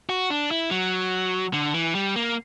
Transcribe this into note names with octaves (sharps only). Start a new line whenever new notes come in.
F#4
D4
E4
F#3
D3
E3
G3
A#3